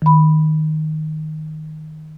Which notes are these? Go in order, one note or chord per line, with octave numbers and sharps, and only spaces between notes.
D#3 B5